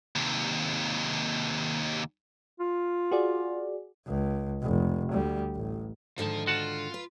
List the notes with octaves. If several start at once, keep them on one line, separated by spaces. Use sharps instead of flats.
D#2 C3
F4
F#4 G#4 D5
C#2
F1
D2 G3
A1
G#2 D3 D#3 F3 A5
F4 F#4 F5 F#5 A5
B4